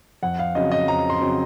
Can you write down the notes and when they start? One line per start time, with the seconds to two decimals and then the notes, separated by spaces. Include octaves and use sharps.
0.23 F2 F#5
0.39 F5
0.55 C#3 F#3 C4 D#5
0.72 D#5
0.88 F2 A#5
1.10 C6
1.21 C#3 F#3 C4